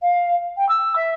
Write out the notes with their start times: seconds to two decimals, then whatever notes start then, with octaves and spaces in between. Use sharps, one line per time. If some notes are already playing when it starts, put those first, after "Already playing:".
0.01 F5
0.56 G5
0.68 E6
0.95 E5